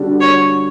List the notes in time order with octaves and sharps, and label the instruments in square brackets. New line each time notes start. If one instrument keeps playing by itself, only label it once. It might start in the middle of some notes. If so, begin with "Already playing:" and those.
Already playing: [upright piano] D3 G3 D4 F#4 A4
[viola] C#5